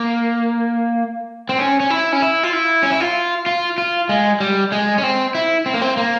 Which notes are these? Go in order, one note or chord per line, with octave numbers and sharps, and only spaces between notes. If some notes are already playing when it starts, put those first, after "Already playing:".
Already playing: A#3
C4
C#4
C#4
E4
C#4
E4
F4
E4
C#4
E4
F4
F4
F4
G#3
G3
G#3
C#4
C4
E4
C4
A#3
C4
A#3